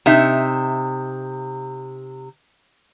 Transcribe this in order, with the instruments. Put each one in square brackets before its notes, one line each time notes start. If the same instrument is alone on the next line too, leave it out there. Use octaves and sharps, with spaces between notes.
[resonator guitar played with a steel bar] C3 D#4 E5